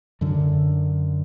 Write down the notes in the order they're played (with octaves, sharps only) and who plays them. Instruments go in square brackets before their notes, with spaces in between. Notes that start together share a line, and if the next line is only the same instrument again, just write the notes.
[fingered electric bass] F#2 D3